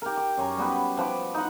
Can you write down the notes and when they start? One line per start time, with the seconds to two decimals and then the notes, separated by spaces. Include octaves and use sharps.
0.02 G4 A#4
0.17 D6
0.37 F#2 C#5 G#5 A#5
0.57 G3 B3 B4
0.97 F3 B4 D6
1.34 D#4 F#5